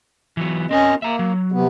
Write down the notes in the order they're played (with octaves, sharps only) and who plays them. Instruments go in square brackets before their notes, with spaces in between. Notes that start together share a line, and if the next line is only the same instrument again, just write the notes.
[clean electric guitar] E3 F#3 B3
[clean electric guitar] C4 A#4 G#5 [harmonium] C#4 D#5
[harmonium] A#3 [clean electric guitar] E5 A#5
[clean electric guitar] F#3
[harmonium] C3 B3